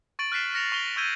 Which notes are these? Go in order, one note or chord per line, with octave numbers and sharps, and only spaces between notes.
C#6 A6 D7 F#7
F6 F#6 A6 B6 C7 E7
F6 A#6 C#7 E7 F7
C#6 F7 G7
C#6 E6 G6 G#6 D#7 G7